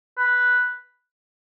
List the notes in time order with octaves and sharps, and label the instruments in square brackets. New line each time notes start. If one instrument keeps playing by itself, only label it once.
[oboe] B4